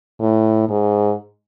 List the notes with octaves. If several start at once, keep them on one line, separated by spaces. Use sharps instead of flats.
A2
G#2